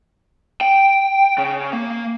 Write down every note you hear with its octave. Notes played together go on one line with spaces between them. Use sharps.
G5
C#3
A#3